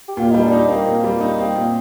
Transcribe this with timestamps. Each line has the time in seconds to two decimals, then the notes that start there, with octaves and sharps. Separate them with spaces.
0.08 G4
0.17 A#2 F4
0.31 G3 D#4
0.43 D4
0.52 D#4
0.68 A#3 C4
0.85 A#2
1.04 G3
1.21 D#4
1.38 C4
1.55 A#2